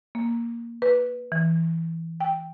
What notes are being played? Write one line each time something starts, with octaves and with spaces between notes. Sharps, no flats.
A#3
B4
E3
G5